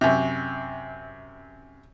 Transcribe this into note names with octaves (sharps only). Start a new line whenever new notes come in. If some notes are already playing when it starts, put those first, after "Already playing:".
F#2 C3